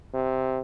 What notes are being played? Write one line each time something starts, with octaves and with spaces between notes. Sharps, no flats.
C3